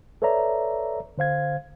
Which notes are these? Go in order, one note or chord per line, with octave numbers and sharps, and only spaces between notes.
A4 B4 C#5 D5 E5 A#5
D3 C5 F5 G#6